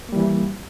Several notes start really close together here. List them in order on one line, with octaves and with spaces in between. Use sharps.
A#3 G3 E3